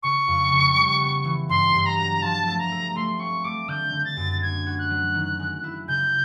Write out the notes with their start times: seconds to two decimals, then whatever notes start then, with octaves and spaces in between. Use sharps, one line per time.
0.03 C#3 C#6
0.28 F2
0.51 C#3
0.76 G3
1.01 B3
1.24 E3
1.49 G2 C6
1.74 G2
1.86 A#5
1.98 F#3
2.22 F3 A5
2.47 A3
2.59 A#5
2.71 A3
2.95 A3 C6
3.20 C4 C#6
3.44 A3 D6
3.68 D3 G6
3.93 D3
4.05 A6
4.17 F#2
4.42 D4 G#6
4.66 F#4
4.79 F#6
4.90 F#3
5.15 D#3
5.39 G#3
5.64 E4
5.88 C#3 G6